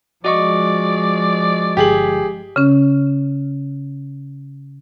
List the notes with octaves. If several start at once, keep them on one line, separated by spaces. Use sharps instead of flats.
F3 G#3 F#4 D5 D#5 C#6
G1 G4 G#4 F#7
C#3 C#4